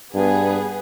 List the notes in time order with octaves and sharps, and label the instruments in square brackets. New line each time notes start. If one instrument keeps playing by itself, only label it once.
[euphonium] G2 [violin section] B3 G#4